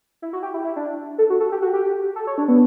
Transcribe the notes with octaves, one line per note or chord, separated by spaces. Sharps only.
E4
F#4
G4
E4
E4
D4
A4
F#4
A4
G4
F#4
G4
A4
C#5
D4
B3